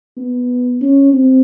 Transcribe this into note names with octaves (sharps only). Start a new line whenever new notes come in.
B3
C#4
C4